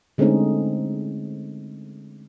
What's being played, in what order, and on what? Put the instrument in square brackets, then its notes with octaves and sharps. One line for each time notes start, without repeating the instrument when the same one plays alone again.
[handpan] D3 G#3 A3 C4 C#4 D#4